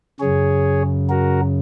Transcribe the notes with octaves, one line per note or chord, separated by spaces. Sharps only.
F#2 C#3 G#4 C#5
F#4 A#4